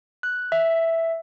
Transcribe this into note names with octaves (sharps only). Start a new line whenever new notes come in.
F#6
E5